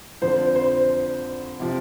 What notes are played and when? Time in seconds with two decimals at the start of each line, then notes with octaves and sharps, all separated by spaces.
0.22 F2 D3 F3 C5
0.56 C5
1.60 C3 F3